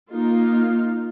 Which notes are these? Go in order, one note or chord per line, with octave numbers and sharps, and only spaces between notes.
A#3 D#4 F4